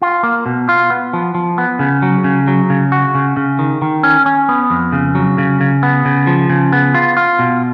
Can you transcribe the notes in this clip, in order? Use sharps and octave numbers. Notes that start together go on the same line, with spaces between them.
F4
A#3
B2
F4
B3
F3
F3
B3
C#3
F#3
C#3
F#3
C#3
F#4
C#3
C#3
D#3
D#3
C#4
C#4
B3
F2
C#3
F#3
C#3
C#3
B3
C#3
F3
C#3
B3
F4
F4
B2